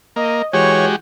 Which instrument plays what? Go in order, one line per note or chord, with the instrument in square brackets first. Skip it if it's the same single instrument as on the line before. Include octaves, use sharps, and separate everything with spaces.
[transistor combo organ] A#3 [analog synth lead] D#5
[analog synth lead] E3 [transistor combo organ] G#3 F#4 G4 [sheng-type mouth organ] C#5